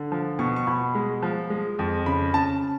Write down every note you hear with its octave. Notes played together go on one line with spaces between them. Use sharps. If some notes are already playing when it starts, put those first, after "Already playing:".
Already playing: D3
F3
B2 C#6
C#6
B2 B5
G#3
F3
G#3
F2
C#3 B5
C#3 A5